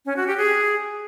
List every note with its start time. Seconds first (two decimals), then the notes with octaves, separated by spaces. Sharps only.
0.06 C#4
0.16 F#4
0.27 G4
0.38 G#4